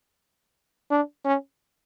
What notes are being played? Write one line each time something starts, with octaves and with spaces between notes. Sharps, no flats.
D4
C#4